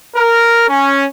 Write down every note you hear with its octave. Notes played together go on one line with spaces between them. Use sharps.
A#4
C#4